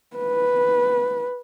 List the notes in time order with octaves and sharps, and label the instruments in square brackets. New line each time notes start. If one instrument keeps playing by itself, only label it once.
[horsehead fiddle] B4